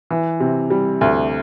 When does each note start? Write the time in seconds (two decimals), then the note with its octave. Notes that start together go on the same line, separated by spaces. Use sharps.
0.11 E3
0.40 C3
0.70 G3
1.01 D2